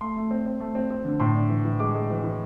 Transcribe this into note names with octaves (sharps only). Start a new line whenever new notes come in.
A3 C6
A3
C4
C4
A3
C4
C4
D3
A2 C6
D4
E3
E3
G#3 D6
G#3
E3
E3